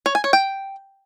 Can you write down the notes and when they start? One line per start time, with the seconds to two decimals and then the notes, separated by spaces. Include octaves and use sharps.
0.06 C#5
0.15 G#5
0.24 C#5
0.33 G5